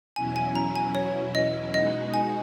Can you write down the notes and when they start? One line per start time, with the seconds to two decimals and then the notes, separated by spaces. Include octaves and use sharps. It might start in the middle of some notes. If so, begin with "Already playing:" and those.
0.16 E2 B2 F#3 C#4 E4 G#5
0.36 G#5
0.55 A#5
0.75 G#5
0.95 C#5
1.35 D#5
1.74 B2 G#3 D#4 F#4 D#5
2.14 G#5